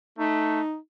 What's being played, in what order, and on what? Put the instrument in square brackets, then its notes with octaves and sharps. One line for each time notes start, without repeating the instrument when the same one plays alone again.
[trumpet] A3 [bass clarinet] D#4